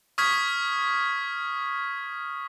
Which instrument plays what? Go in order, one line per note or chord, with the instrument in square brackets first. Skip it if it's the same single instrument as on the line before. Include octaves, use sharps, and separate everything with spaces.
[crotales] C#6 D#6 F6 G#6 B6